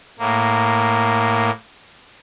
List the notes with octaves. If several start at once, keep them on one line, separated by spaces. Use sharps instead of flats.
A2 A#3